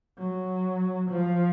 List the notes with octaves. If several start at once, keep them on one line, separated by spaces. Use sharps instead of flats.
F#3
F3